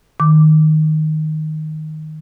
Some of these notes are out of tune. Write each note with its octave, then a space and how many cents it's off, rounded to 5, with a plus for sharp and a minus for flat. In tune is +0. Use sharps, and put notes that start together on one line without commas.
D#3 +0 D6 +0